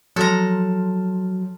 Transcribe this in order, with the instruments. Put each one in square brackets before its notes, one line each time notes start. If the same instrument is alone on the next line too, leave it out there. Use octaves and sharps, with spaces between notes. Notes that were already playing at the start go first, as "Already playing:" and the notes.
[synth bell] F3 [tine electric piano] F#3 [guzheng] A4 A#5